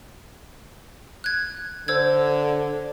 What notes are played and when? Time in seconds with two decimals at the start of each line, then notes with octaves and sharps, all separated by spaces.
1.24 F#6 G#6
1.88 D3 C5 E6 G#6